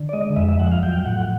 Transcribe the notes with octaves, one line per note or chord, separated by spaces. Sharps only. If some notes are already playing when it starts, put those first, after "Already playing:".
Already playing: D3
D5
G#3 D#5
F2 E5
E5
F3 F#5
F5
F#3 G5
A2 F#5